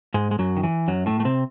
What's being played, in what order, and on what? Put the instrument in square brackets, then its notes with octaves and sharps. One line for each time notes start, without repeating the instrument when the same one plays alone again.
[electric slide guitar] G#2 G#3
G#3
F#2 F#3
D#3
E3
F#2 F#3
A2 A3
A3
C3 C4